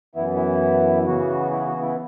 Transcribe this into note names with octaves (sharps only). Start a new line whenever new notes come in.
F#2 E3 B3 E4
E4
C#3 E3 B3 F#4
E4
F#4
E4